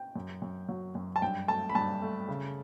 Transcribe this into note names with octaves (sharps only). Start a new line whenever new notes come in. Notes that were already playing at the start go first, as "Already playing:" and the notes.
Already playing: G5
F#2
F#2
F#3
F#2
A5
G2 G5
A3 A5
B5
G2 A5
A3
C#3